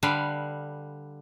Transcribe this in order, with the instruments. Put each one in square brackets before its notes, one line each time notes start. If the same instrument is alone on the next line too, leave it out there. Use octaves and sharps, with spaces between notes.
[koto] D3 G3 B4 F5